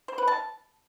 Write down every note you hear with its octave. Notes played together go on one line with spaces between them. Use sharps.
C5
B4
A5